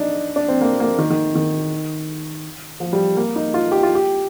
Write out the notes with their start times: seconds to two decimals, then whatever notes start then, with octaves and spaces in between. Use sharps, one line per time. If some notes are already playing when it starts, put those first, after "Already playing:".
Already playing: D4 D#4
0.36 D4
0.49 C4
0.61 A#3
0.80 A#3
0.99 D#3
1.10 D#3
1.35 D#3
2.80 F3
2.93 G3
3.17 A#3
3.36 D#4
3.54 F4
3.72 G4
3.83 F4
3.95 G4